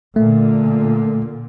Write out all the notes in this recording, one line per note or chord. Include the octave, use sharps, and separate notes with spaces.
A#2 D3 A3